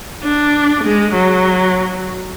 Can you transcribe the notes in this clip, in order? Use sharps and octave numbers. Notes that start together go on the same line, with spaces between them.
D4
G#3
F#3